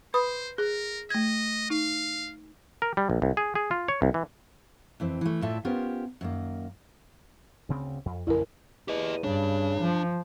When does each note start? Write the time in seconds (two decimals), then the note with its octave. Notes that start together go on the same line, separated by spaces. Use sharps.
0.14 B4 C5 B5 D#6
0.58 G#4 A#4
1.10 A3 D#5 G#6
1.70 D#4 F5
2.82 A#4
2.97 G3
3.10 A#1
3.22 C2
3.37 G#4
3.55 G#4
3.71 F4
3.88 C#5
4.02 C2
4.14 E3
5.00 F2 E3 C4
5.21 E3 A3
5.42 A2 F4 A4 D5 E5 A5
5.65 B3 C#4 F4 G4 A#4 C5
6.21 F#2 D#3 A#3
7.69 D2 C#3 C4
8.06 F2
8.27 A1 F2 C#3 E4 A#4
8.88 E2 G4 D#5
9.24 G2 C#3 D4
9.80 F3